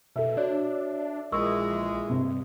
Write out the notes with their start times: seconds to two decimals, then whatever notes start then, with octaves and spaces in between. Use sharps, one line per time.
0.16 B2 A4 E5
0.37 D4 F#4 C#5 D5
1.32 A#1 A#2 E3 G#3 A#4 C#6 E6
2.09 G2 C3